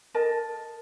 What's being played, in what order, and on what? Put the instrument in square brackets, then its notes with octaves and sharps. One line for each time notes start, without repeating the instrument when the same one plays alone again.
[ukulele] A4 A#4 D#5 A5